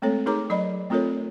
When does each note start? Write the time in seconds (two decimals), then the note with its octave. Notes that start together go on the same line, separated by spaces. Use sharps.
0.02 G#3 A3 C4 A4 C#5
0.26 D#4 G#4 A#4 C#5 A#5 D6
0.50 F#3 D5 D#5 B5
0.90 A3 C4 F4 A4 A#4 C#5